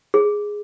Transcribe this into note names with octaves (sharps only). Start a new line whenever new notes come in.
G#4